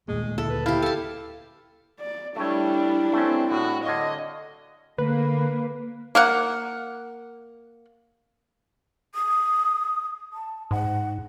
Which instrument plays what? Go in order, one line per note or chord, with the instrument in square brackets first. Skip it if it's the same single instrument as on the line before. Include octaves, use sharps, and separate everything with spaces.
[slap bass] D#2 A#2 A3 [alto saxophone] G#3
[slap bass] D2 A#2 C#3 [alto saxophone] E4 [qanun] A4
[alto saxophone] B4
[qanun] E4 G4 [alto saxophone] F5
[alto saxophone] A4 [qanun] F5 A5
[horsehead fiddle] D5
[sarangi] G3 [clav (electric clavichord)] A3 C#5 [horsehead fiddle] D4 E4
[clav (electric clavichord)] A3 C#4 [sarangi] C4
[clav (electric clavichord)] A2 [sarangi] F#4
[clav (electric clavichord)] D3 C#5 F5 [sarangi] D#5
[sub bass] D3 [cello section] A#3 [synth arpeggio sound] B4
[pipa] A#3 A#4 F#5
[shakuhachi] D#6
A5
[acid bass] G#2 [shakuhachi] F#5